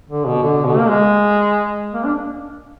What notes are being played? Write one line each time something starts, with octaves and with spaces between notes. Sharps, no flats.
D3
B2
D3
B2
A#3
G#3
A#3
D4